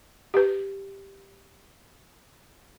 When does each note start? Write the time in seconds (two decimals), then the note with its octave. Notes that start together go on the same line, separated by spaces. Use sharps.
0.34 G4 B4